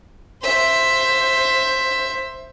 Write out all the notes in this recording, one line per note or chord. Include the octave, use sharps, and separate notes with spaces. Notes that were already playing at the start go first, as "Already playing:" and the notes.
C5 E5